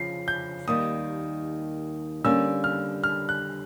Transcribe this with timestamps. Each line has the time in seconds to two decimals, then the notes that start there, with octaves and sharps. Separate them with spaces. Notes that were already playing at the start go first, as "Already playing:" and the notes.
Already playing: C#3 F3 C7
0.28 G6
0.67 D#2 D#3 G3 D#6
2.24 D3 G3 A#3 C#4 E6
2.64 F6
3.04 F6
3.29 F#6